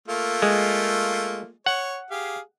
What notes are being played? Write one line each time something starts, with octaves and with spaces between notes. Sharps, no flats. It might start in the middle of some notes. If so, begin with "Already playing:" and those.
A3 A#3 F4
G#3
C#5 F#5
G4 G#4 F5